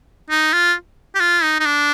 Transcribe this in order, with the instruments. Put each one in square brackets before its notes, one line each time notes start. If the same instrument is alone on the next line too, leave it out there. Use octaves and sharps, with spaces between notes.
[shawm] D#4
F4
G4
F4
D#4
D#4
D4